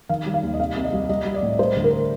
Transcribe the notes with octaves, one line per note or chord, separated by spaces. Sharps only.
D#3 F5
G3
F5
D#2
D#5
C2 F5
C2
D#5
G3
G3 D#5
G3
D5
A2
G3 C5
D2
A#4